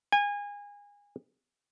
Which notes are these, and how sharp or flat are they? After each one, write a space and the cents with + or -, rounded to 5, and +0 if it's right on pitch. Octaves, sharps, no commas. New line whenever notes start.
G#5 -25